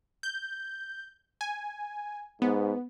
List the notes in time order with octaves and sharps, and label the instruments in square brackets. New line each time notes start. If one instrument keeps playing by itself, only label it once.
[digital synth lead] G6
G#5
[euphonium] G#2 [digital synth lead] B3